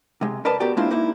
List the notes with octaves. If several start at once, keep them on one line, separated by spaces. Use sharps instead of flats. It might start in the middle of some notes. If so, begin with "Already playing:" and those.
C3 G#3
A#4 B4 D5 D#5 A5 B5
B3 F#4 G4 A#4 D5 G5
G#3 A#3 C4 D4 E4 F4
A#3 D#4 E4